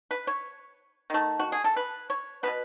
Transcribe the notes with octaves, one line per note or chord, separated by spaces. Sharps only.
B4
C#5
D#3 A3
F#4
G#4
A4
B4
C#5
B2 G#3 B3 B4